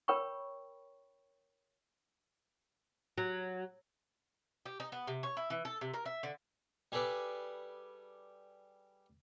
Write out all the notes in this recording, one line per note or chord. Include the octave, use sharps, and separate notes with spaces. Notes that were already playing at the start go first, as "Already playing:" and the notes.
A#4 C#5 G5 B5 C#6
F#3
G4
D#4
B3
C3
C#5
E4
E3
A4
C3
A#4
E5
D3
G3 G#4 A4 B4 D5